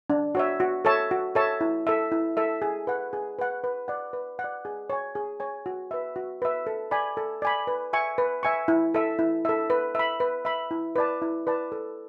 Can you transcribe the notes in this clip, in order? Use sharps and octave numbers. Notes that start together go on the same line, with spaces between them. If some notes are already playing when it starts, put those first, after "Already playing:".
D4
F#4 C#5 E5
F#4
A4 C#5 E5 A5
F#4
A4 C#5 E5 A5
E4
A4 E5
E4
A4 E5
G#4
B4 F#5
G#4
B4 F#5
B4
D5 F#5
B4
F#5
D5
G#4
C#5 G#5
G#4
C#5 G#5
F#4
B4 E5
F#4
B4 E5
A4
D5 G#5 B5
A4
D5 G#5 B5
B4
E5 G#5 C#6
B4
E5 G#5 C#6
E4
A4 E5
E4
A4 E5
B4
E5 B5
B4
E5 B5
E4
B4 D5 A5
E4
B4 D5 A5
A4